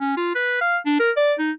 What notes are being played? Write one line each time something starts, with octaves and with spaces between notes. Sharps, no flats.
C#4
F4
B4
F5
D4
A#4
D5
D#4